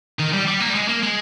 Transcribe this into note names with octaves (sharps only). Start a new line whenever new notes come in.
D#3
G3
G3
A#3
G3
G#3
A#3
G#3